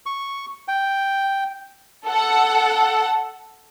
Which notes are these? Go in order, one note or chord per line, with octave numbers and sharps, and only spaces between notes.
C#6
G5
A4 F#5